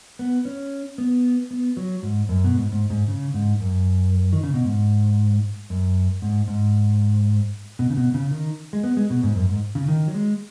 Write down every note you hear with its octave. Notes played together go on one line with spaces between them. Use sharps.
B3
C#4
B3
B3
F#3
G#2
F#2
B2
G#2
G#2
G#2
C#3
G#2
F#2
D#3
C#3
B2
G#2
F#2
G#2
G#2
B2
C#3
B2
C#3
D#3
G#3
B3
G#3
B2
G#2
F#2
G#2
C#3
D#3
F#3
G#3